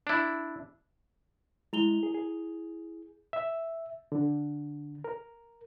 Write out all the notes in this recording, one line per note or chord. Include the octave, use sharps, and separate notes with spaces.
D4 E4
G#3 E4 F7 G7
G#4
G#4
E5
D3
A#4